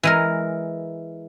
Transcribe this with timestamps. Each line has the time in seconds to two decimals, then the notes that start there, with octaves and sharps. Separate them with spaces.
0.03 E3 G#3 A#4